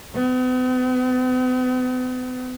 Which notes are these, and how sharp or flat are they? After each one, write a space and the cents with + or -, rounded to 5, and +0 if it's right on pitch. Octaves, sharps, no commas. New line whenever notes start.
B3 +45